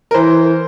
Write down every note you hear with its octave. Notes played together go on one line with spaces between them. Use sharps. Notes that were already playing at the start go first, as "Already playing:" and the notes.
A#4
E3 C5